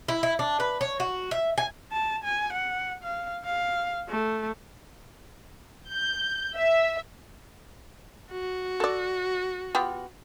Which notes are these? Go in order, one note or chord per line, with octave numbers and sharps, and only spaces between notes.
E4
E4
D4
B4
C#5
F#4
E5
G#5
A5
G#5
F#5
F5
F5
A3
G6
E5
F#4
A4 D5
B3 F4 G4